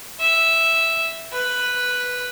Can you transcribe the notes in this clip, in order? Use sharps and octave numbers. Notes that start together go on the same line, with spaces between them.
E5
B4